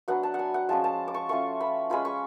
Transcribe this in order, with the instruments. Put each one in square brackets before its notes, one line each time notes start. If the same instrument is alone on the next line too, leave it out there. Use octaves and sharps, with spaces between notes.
[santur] F#3 B3 D4 F#5
A5
F#5 G#5
F#5
F3 G#3 C#4 F4 A5
A5
D6
C#6
A3 C#4 F4 C#6
B5
G#3 C#4 F4 B5
C#6